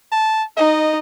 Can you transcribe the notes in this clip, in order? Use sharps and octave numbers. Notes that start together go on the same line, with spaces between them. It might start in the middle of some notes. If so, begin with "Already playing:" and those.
A5
D#4 D#5